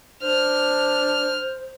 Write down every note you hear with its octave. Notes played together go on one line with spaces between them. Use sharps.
D4 C5 F6